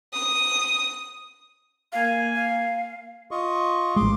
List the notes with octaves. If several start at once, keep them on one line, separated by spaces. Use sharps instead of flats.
D#6
A#3 F5 G#5
F5
F4 D#5 C#6
A1 G#3 C6 D6